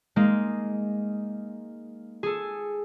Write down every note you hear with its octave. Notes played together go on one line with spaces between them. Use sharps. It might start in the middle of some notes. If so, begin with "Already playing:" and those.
G#3 A#3 D#4
G#4 A4